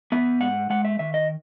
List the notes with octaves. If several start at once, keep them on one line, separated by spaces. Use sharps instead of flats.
B3 E5
G#2 F#5
G#3 F#5
E5
D#3 E5
D#5